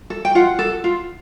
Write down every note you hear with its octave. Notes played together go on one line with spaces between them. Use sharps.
A4
G5
F4 F#5
A4
F4